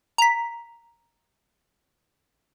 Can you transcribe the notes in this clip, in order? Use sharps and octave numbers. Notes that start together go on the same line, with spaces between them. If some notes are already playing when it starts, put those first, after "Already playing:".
A#5 B6